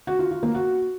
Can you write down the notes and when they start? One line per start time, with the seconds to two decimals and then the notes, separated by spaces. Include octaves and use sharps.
0.07 F#4
0.19 F4
0.31 F4
0.43 A#3
0.55 F#4